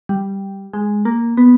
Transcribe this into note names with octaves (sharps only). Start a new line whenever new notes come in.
G3
G#3
A#3
B3